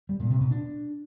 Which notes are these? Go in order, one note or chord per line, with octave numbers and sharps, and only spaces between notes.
G3
A#2
C3
B2
D4